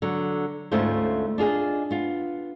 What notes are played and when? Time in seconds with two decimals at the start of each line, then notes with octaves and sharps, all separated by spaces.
0.02 D3 F#3
0.72 D2 G#2 A3 C#4 F4 C5
1.38 D4 F4 G#4 D#5
1.91 B3 F4